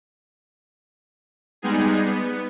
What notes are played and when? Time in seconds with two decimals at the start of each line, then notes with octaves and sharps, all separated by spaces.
1.62 G3 G#3 B3 D#4 G#4
2.05 B3